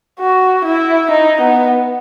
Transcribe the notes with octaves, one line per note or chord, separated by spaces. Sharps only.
F#4
E4
D#4
B3